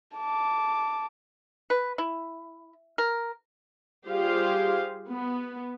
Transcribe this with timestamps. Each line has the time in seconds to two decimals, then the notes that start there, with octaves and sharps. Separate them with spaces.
0.17 A5 D6
1.70 B4
1.98 E4
2.98 A#4
4.07 G3 F4 G4 G#4 C5 F5
5.10 B3